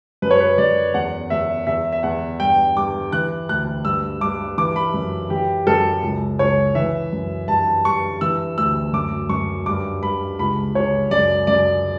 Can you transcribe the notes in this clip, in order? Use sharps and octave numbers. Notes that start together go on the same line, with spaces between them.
F#2 B4
C#5
B4
F#2 D5
E2 F#5
E2 E5
E2 E5
E5
E2 F#5
G2 G5
G2 D6
E3 F#6
D2 F#6
G2 E6
G2 D6
E3 D6
B5
F#2
E3 G4
F#2 A4
C#2
C#2 C#5
E3 E5
F#2
G2 A5
G2 C#6
E3 E6
D2 E6
F#2 D6
F#2 C#6
G2 D6
G2 B5
C#2 B5
C#2 C#5
F#2 D5
F#2 D5